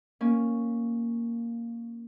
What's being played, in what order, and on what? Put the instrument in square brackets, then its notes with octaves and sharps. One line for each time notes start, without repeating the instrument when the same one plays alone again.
[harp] A#3 C#4